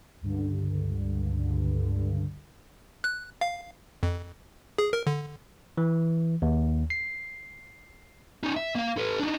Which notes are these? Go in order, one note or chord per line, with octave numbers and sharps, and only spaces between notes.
C#2 G2 D3
F#6
F5
F2
G#4
A#4
D3
E3
D#2
C7
C#4 D#4
E5
A#3 F5
A4 B4
D4 D#4